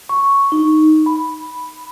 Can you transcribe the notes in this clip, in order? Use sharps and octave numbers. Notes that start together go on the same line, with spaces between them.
C#6
D#4
B5